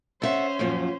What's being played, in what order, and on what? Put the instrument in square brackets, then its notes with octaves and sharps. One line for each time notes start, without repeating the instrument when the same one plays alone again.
[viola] C#4 C5 [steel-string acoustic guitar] A4 E5 F#5
[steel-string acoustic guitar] F#2 A#2 F3